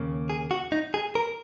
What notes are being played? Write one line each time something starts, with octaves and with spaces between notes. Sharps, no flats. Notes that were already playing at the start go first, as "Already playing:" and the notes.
Already playing: D#2 C#3 A#3
G#4
F#4
D#4
G#4
A#4